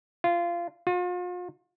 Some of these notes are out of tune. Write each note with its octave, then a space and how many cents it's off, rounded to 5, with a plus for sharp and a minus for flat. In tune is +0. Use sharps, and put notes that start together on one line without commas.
F4 -20
F4 +40